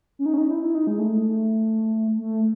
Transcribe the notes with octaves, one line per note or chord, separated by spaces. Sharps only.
C#4
D#4
C#4
D#4
E4
E4
D#4
G#3
A3
A3